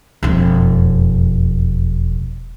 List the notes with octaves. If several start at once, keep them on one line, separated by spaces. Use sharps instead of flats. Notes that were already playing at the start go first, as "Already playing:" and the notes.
E1 F2